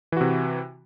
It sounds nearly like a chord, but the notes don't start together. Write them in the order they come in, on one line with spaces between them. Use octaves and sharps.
E3 F#4 C3